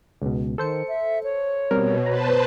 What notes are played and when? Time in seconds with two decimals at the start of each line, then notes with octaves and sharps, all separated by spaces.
0.22 C#2 B2
0.58 D#3 A4 C5 C#7
0.88 E5
1.24 C#5
1.71 B2 G3 C4 A#4
2.06 B4 C5 A5 A#5